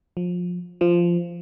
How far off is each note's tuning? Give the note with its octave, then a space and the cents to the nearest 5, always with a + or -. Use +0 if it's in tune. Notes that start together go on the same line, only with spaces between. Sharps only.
F3 +25
F3 -10